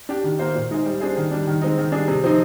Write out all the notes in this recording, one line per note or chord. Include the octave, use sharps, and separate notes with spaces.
D4 G4
D#3
A#3 F4 C5
A#2
G#3 D#4 G#4 C5
G3
D4 G#4 C5
D#3
G3 D4
D#3
G#3 C4 D#4
D#3
G3 D4 G#4
C3
F3 C4 D#4